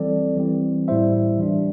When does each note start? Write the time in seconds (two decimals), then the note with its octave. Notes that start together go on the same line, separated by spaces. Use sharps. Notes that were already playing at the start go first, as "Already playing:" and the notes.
Already playing: E3 G3 C4 A4 D5
0.36 E3 G3 C4
0.88 A2 G3 E4 C5 E5
1.38 E3 G3 D4